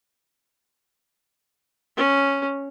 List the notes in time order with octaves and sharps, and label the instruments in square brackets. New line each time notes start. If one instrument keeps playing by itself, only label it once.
[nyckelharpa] C#4